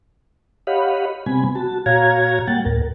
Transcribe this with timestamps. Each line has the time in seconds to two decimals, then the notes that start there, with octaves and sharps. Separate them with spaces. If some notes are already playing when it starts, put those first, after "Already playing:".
0.67 G4 C#5 D#5 F5 F#5 B5
1.26 C3 G3 B3 C4 G#5 B5
1.55 F#4 A5
1.86 A#2 F#4 C#5 F5 A#5 G#6
2.48 G3 A#3 F#5 G5 A6
2.65 D2 A2 A#4